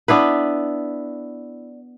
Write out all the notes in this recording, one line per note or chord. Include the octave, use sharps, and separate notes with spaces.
B3 D4 E4 B4